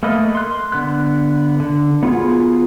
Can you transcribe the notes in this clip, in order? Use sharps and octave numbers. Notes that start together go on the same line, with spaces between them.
A3 A#3 A4 B4 D#5
C6 F#6
D3 B3 F#6
D3
B3 F4 F#4 G#4